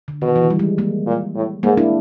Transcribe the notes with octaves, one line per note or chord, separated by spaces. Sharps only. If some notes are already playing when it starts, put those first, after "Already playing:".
D3
B2 D#3
E3
G3
G#3
G#3 A#3
A#2
A2
G#2 G#3 A#3
D4 E4